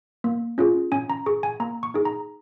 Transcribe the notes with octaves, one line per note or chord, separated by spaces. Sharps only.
A#3
C#4 F4 G#4
C#4 G#5
A#5
G#4 C#6
G#5
A#3 A#5
C#6
D#4 G#4
A#5